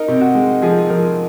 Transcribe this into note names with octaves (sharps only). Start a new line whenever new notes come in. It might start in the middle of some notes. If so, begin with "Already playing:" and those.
Already playing: D#4 A#4
C3
F#4
G#3
F3 G#4
F3 A#4